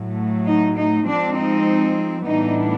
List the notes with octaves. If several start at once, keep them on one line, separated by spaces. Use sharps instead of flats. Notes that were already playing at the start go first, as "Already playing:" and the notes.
Already playing: A2 F#3 A3
D#4
D#4
F3 G#3 C4 D4
D#4
A2 E3 G3 B3 D4 D#4